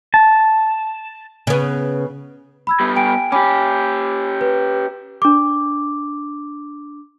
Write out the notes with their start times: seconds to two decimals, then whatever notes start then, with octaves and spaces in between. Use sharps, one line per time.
0.14 A5
1.47 C#3 B3
2.67 B5 E6 G#6
2.80 G3 B3
2.96 G5 G#5 D7
3.32 C#4 G4 G#5 B5 D6
4.41 B4
5.22 D4 D6